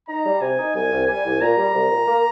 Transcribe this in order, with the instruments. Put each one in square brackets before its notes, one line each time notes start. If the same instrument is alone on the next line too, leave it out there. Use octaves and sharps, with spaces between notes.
[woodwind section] D#4 [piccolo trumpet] A#5
[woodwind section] G3
[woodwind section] C3 [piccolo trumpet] G#5
[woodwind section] D#4
[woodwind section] C2 [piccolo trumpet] G#5
[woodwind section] C2
[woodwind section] G3 [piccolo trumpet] G#5
[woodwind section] C2
[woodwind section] A#2 [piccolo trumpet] A#5
[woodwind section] G3
C2
A#2
A#3